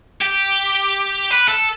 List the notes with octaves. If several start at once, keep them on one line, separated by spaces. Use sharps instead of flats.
G4
B4
A4